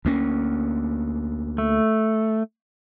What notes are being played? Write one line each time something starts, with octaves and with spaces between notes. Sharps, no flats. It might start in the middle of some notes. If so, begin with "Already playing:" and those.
D2 A#3 C#4
A3